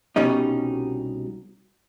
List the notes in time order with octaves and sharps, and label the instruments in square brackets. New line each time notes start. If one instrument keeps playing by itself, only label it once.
[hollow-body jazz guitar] C2 B2 G3 C#4 D#4